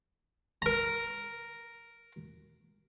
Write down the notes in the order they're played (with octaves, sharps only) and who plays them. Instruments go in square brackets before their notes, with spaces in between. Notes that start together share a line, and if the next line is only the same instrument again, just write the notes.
[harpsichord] A#4 A#5